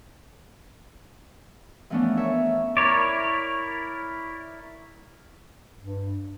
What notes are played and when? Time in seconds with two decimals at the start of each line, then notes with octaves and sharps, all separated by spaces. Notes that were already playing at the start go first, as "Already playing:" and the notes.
1.90 E3 F3 A3 B3 C#4 D4
2.17 A#4 C#5 E5
2.77 E4 A#4 C#5 D5
5.80 G2